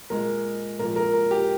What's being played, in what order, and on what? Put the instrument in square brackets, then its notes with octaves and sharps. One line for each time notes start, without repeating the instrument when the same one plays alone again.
[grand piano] A#2 G#3 A#4
A#2 F3 G#3 A#4
A#4
A#4
G4